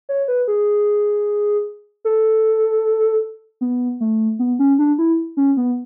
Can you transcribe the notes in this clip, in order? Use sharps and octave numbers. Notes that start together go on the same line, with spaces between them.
C#5
B4
G#4
A4
B3
A3
B3
C#4
D4
E4
C#4
B3